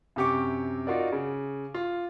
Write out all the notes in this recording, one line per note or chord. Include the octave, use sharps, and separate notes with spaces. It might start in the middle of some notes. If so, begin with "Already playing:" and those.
F#2 C3 G4 C#6 D6
D#4 F4 F#4 A#4 D5
C#3
F4